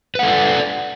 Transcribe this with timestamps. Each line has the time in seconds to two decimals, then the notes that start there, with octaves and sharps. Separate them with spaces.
0.15 B4
0.19 F#5
0.23 A4
0.27 D5